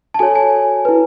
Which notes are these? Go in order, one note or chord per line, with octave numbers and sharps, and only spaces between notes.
A5
F#4 A4 C#5 G#5
G#5
E4 B4